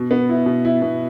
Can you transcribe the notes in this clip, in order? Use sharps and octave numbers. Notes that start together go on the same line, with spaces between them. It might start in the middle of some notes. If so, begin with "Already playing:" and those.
Already playing: B2
B3
E4
B2
E4
B2